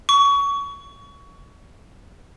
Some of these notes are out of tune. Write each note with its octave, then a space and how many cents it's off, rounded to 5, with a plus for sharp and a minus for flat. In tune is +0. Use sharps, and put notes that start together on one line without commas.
C#6 +25